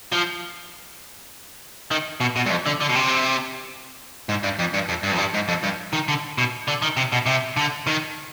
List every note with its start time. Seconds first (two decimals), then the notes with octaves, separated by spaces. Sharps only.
0.12 F3
1.91 D#3
2.21 B2
2.36 B2
2.46 G2
2.50 F2
2.66 D3
2.81 D3
2.89 B2
2.95 C3
4.29 G#2
4.43 G2
4.59 F2
4.74 G2
4.89 F2
5.03 G2
5.12 F2
5.18 G2
5.34 G#2
5.48 F2
5.63 G2
5.93 D#3
6.08 D3
6.38 B2
6.68 D3
6.82 D#3
6.97 C3
7.12 B2
7.26 C3
7.57 D3
7.87 D#3